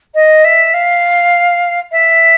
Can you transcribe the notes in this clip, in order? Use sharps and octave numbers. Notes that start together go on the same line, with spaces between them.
D#5
E5
F5
E5